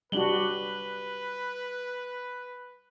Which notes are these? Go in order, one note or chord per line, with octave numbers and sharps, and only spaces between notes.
G3 D4 F#4 B4 F#7 G7